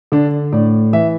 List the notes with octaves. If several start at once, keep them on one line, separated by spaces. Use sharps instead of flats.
D3 D4
A2 D5
E3 E5